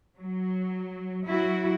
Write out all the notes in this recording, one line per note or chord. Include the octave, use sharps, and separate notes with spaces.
F#3
F#3 E4 F#4